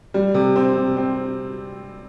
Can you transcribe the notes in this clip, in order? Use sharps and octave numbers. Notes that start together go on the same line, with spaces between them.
G3
C3
C4
C3
C4